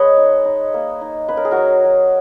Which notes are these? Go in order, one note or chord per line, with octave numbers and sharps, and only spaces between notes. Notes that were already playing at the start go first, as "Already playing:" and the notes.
Already playing: G#3 B4 C#5 D#5
D#4
D#4
A#3
D#4
C#4 B4
A#4
G#4
F#4 A#4
F#3
F#3